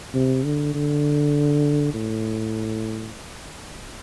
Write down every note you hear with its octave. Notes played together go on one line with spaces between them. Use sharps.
C3
D3
D3
A2